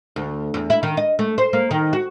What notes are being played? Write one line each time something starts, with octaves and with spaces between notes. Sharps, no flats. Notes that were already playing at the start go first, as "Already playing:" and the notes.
D2
E2
E4
D#3
D#5
A3
C5
A#3
D#3
F#4